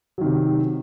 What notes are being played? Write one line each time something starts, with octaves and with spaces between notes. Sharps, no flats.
C3 D#3 F#3